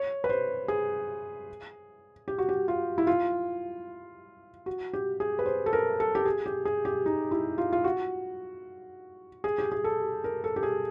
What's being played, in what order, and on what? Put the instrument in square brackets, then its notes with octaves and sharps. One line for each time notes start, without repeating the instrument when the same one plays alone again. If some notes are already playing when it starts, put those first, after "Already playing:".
Already playing: [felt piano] C#5
B4
C5
G#4
G4
F#4
G4
F4
E4
F4
F#4
G4
G#4
B4
C5
A4
A#4
A4
G4
G#4
G4
G#4
G4
D#4
E4
F4
F4
F#4
G#4
G4
G#4
A4
A#4
A4
G4
G#4